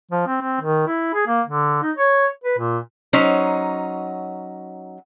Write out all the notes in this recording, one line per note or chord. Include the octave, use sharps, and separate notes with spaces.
F3
C4
C4
D#3
E4
G#4
A#3
D3
D#4
C#5
B4
A#2
F#3 C#4 D#4 C5